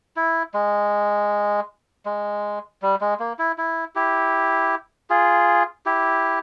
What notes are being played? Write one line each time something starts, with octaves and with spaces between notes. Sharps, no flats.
E4
G#3
G#3
G3
G#3
A#3
E4
E4
E4 G4
F4 G#4
E4 G4